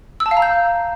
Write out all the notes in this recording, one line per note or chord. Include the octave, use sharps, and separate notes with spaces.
E6
A5
F5
A#5
G6